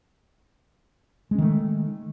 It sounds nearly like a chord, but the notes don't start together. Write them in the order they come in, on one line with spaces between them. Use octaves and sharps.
G#3 C#4 D#3 A3